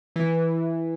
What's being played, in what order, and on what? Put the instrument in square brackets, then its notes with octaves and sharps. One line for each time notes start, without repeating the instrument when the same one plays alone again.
[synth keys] E3